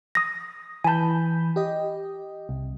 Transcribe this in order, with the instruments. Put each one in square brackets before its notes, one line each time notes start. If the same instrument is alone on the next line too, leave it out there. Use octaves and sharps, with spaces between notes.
[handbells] D#6 A#6
[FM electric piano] E3 B5 G6 [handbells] G#5 A5
[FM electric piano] G4 D#5
C2